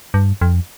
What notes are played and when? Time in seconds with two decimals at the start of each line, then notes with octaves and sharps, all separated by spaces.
0.14 G2
0.41 F2